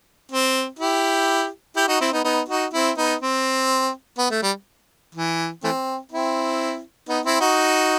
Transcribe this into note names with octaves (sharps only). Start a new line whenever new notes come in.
C4
E4 G4
E4 G4
D#4 F#4
C4 E4
B3 D#4
B3 D#4
D#4 F#4
C4 E4
B3 D#4
C4
B3
A3
G3
E3
E3 A3 C4
C4 E4
B3 D#4
C4 E4
D#4 F#4